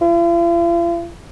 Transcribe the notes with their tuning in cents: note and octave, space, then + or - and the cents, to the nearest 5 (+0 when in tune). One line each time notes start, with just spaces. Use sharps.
F4 -45